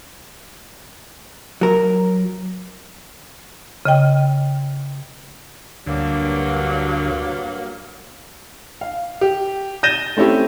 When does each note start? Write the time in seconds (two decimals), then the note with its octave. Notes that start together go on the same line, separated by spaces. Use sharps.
1.61 F#3 A#4
3.85 C#3 D#5 G5
5.86 D2 G2 F#3 A#3
8.81 F5
9.21 G4
9.83 G6 A6 A#6 D#7 E7 G7
10.17 A3 C4 C#4 E4 G4